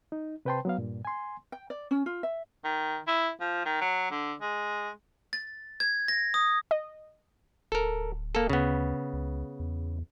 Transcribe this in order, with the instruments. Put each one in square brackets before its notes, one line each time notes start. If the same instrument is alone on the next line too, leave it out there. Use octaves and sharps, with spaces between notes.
[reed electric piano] D#4
C3 B4 C5 G5 A5 C6
F#3 B3 F5
G2 A#2
G#5 C6
[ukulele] G5
D5
C#4
F4
E5
[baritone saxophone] D#3
E4
F3
D#3
F#3
D3
G#3
[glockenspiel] A6
G#6
A#6
D#6
[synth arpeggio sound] D#5
[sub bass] D1 [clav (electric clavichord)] A4 A#4
[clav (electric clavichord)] A#3 A4
[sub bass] D2 [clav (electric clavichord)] C#3 B3
[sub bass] C#2
E2